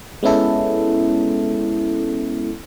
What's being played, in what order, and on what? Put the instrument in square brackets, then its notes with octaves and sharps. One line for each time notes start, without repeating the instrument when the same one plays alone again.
[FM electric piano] G#3 B3 C#4 E4 A4